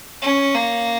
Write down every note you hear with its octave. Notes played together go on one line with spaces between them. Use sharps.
C#4
A#3